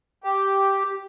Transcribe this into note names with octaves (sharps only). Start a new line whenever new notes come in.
G4